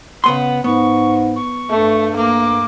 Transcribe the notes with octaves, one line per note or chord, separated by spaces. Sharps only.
C#3 B3 F#5 C6
G#2 B3 C#6
C#6
G2 A3
A#3 D6